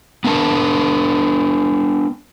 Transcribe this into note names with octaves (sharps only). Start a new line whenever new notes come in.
B3 D4 A#4 A5